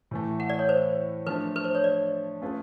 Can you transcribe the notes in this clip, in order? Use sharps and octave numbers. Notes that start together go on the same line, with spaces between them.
A2 E3 A3
F#5
D5
C#5
C5
F3 A3 D4 B4
B4
C5
C#5
D5
A3 C#4 F4 G#4 B4